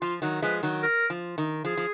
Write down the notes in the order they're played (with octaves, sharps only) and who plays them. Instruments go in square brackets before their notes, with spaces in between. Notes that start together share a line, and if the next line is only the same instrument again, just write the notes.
[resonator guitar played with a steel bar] F3 [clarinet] F4
[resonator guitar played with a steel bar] D#3 F#3
[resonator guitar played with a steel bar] F3 G#3 [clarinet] B4
[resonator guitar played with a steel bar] D#3 F#3
[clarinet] A#4
[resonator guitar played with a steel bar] F3
D#3
[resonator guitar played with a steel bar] F3 [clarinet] G#4
[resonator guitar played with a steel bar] F3